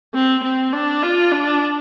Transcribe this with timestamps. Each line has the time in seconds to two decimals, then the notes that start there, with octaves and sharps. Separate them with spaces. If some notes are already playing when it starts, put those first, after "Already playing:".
0.14 C4
0.43 C4
0.73 D4
1.03 F4
1.31 D4